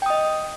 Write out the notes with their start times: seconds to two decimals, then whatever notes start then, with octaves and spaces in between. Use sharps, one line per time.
0.02 G5
0.06 D#6
0.10 D#5